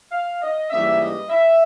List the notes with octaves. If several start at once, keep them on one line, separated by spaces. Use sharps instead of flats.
F5
D#5
G#2 E3 G3 A#3 C#4 E5
D#5
E5